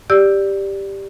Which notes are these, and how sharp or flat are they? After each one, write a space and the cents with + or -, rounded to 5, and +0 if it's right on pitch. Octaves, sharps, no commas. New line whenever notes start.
G4 +5 D5 +0 E6 +0